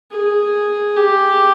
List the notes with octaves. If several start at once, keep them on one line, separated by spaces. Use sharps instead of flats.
G#4
G4